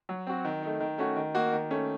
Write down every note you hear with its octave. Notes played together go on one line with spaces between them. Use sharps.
F#3
C4 F#4
D#3
A3 D#4
D#3
A3 C#4 F#4
D#3
A#3 D#4 F#4
D#3
A3 C#4